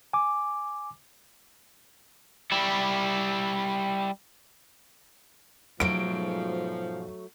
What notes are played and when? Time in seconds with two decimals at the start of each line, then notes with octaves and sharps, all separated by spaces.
0.13 G#5 D6
2.51 G3 E4
5.80 G#2 B2 F3 F#3 A3 D7